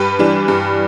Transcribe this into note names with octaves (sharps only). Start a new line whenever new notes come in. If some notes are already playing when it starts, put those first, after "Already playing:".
Already playing: G2 G4 B4
E3 G3 D4
G2